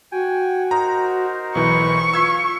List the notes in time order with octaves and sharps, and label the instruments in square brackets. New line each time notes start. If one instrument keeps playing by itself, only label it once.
[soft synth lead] F#4 [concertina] G5 G#5
[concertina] D#4 A#4 C5 [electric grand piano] A#5
[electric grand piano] B1 E3 [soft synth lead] B4 [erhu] C#6
[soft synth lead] F4 [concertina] F5 [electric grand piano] E6 G#6 B6